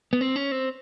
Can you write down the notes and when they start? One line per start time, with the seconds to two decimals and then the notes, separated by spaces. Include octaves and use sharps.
0.13 B3
0.21 C4
0.36 C#4
0.52 C4